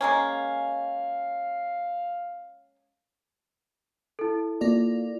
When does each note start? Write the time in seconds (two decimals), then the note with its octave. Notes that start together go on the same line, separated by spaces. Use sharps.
0.01 G#3 A#3 C#4 F5
4.19 E4 A4
4.61 A#3 F4 D5